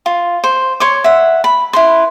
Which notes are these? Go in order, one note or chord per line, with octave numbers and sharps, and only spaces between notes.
F4
C5
C#5 C6 D6
E5 F#5
B5
E4 B4 C6